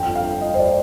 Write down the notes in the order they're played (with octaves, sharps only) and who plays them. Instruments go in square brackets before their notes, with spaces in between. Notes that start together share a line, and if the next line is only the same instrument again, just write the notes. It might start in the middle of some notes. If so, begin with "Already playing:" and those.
Already playing: [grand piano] G1 F2 D3 [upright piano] G5
[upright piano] F5
D#5
C5
D5